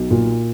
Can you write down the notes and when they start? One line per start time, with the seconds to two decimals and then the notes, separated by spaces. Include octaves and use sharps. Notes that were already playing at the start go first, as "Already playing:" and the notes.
Already playing: B1
0.11 A#2